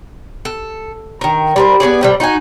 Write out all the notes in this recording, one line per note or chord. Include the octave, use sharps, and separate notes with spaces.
A4
D#3 A#4
G3 A#4 C5
B3 C#4 G#4 D5
A2 C3 G3
D#4 F#4 G4 G#5